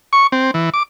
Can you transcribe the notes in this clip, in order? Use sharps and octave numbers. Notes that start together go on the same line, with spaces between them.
C#6
C4
E3
D6